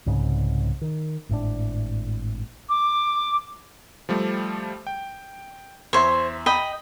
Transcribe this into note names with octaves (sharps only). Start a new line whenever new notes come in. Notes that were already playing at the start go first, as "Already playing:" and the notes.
C2 G#2 C#3
D#3
G#1 A2 D4
D6
F3 G3 A3
G5
E2 C5 C#5 E5
D#5 G5 B5